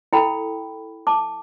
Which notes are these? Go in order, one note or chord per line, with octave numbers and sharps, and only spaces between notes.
E4 A4 G5 B5
A5 D6